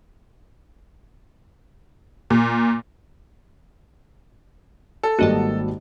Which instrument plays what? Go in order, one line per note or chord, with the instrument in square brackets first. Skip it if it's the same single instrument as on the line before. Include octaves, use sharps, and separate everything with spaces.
[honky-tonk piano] A#2
[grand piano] A4
[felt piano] G#1 G3 A#3 [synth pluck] F#4 D#5 A5